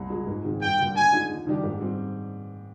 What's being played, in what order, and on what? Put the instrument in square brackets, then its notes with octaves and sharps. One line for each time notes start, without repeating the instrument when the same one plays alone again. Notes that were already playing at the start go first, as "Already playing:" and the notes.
Already playing: [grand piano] C2
A#2 G#3
G#2
D#3 G#3 C4
[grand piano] G2 [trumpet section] G5
[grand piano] D3 G3 A#3
[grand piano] D3 [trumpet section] G#5
[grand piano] F3 G#3 D#4
D#2
D#3 G3 D4 G4
G#2
G3 C4